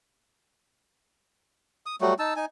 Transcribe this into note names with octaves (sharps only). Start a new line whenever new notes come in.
D#6
F#3 G3 A3 F#4
D#4 A5 E6
D#4 G#5